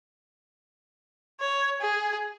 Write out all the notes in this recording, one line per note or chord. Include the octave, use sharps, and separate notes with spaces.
C#5
G#4